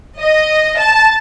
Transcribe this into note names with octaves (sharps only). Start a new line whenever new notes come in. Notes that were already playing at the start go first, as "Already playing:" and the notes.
D#5
A5